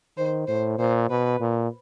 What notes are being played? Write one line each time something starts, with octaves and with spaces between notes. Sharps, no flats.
D#3 C5
A2 C5
A#2 C5
B2 B4
A#2